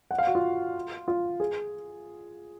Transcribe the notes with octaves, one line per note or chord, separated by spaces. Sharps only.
F#5
F5
F#4
F4
F4
G#4